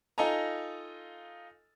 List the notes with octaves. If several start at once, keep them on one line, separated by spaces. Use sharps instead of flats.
D#4 F4 A4 D#5 G#5 A#5